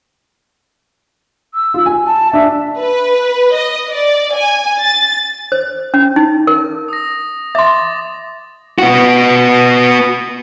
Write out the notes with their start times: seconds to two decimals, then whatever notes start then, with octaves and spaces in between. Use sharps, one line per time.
1.54 E6
1.74 F4
1.86 G#5
2.07 A5
2.33 D4 E5
2.79 B4
3.55 D#5
3.92 D5
4.35 G#5
4.81 A6
5.52 C5
5.94 C#4
6.16 D#4
6.47 A#4
6.88 D#6 A#6
7.55 E5 C6 D6 A6
8.78 B3 F#4